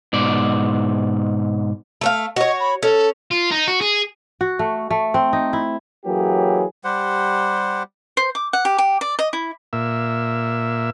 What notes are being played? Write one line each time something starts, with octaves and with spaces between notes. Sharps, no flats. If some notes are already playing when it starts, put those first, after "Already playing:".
G#2 B2 D5
A3 E5 F5
F#4 C#5 D#5
B5
C#4 A4
F4
D#4
F#4
G#4
F#4
A3
A3
C4
D#4
E4
E3 F#3 A#3 C#4 G4 G#4
G3 G4 C5 F#5
C5
D6
F#5
G4
G4
D5
D#5
E4
A#2 E5